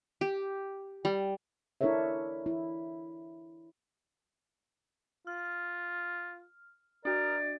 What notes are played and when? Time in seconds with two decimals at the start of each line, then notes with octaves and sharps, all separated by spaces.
0.21 G4
1.05 G3
1.81 D4 E4 A4 A#4 C#5 E5
2.46 E4
5.27 F4 F6
7.05 D4 F#4 A#4 D5